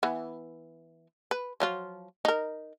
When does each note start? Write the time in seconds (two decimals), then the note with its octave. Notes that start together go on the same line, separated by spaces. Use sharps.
0.03 E3 B3
1.31 B4
1.60 F3 F#3 F4
2.25 D#4 A#4